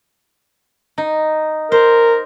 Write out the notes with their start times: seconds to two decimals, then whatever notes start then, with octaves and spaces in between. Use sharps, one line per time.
0.98 D#4
1.72 A#4 C5